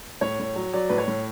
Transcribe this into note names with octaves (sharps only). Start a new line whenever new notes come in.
A2 C#5
A2
F#3
F#3 D5
A2 B4
C#5
A2